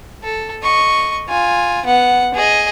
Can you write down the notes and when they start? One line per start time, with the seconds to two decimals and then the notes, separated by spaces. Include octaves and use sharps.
0.24 A4
0.63 D#5 C#6
1.29 F4 G#5
1.86 B3 F#5
2.34 G#4 D#5